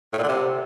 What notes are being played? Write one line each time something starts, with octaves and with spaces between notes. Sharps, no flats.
A2
A#2
D3
C3